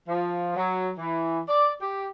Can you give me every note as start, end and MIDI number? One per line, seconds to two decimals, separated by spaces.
0.08 0.56 53
0.56 0.90 54
0.98 1.40 52
1.48 1.69 74
1.81 2.07 67